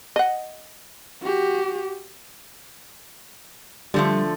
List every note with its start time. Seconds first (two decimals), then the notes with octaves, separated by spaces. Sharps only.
0.16 D#5 F#5
1.22 F#4 G4
3.94 D3 F3 G3 A3